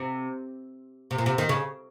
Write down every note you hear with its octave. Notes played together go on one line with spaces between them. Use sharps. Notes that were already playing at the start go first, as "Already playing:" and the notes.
Already playing: C3
C3
A#2
C3
D#3
C#3